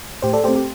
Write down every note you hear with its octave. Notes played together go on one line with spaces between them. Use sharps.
A2 G4 C5
A4 D5
A3 C4 G4 C5
G4